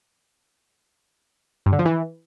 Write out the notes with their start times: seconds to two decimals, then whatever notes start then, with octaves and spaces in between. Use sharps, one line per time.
1.66 G2
1.72 D3
1.79 F3
1.85 E3